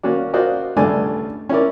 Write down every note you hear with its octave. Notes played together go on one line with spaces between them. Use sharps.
A#3 C#4 F#4 D5
F4 F#4 A#4 C5 D5 D#5
C#2 G2 A3 D5 G#5
C#4 E4 A#4 D5